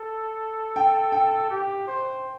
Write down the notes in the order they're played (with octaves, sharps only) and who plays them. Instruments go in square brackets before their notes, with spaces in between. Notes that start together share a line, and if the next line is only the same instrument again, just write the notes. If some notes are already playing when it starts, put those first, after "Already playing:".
Already playing: [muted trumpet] A4
[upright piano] G5
G5
[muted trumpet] G4
C5